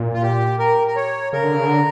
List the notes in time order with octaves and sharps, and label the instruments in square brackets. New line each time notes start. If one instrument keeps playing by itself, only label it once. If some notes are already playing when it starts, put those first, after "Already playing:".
Already playing: [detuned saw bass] A#2
[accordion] F4
G4
A#4
A#4
C#5
[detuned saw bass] C#3 [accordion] A#4
[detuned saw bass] D3
C#3
D3